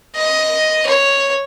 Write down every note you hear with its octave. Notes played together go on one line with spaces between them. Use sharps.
D#5
C#5